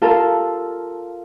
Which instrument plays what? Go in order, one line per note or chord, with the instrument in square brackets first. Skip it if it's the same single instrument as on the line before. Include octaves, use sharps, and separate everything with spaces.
[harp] F4 A4 A#4 F5